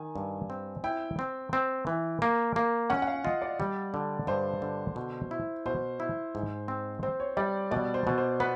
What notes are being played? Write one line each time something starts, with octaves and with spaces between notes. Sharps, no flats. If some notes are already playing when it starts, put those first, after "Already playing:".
Already playing: D#3 G#5
G2
C4
E4 G5
C4
C4
E3
A#3
A#3
C#4 F#5
F#5
F5
F4 D#5
D5
G3
D3
G2 C5
D3
B2
E4
B2 C5
E4
G#2
C4
C4 C5
C#5
G3 D5
B2 D5
C5
B2
C5
B3 B4